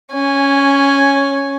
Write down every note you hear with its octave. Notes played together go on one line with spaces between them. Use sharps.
C#4 G#5